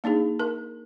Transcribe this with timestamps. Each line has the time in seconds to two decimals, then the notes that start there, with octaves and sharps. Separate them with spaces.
0.04 A#3 D4 D#4 G#4
0.39 A#4